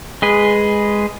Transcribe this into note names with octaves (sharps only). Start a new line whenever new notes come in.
G#3 G#4 B4